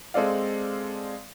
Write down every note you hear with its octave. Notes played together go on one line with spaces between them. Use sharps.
G#3 C4 A4 D5 F5